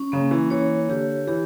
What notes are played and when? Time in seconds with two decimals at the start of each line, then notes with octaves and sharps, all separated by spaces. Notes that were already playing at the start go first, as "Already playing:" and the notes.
Already playing: C#4
0.12 C#3 A#3
0.31 E3
0.50 E3 C#5
0.89 D3 G4
1.27 E3 G4